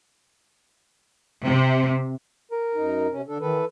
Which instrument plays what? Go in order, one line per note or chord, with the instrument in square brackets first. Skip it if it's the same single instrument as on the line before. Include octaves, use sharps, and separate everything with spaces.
[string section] C3
[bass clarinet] A#4
[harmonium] F#2 D#4
C3 C#4
D3 D4 A4
[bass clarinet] D#3 [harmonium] E3 A4 B4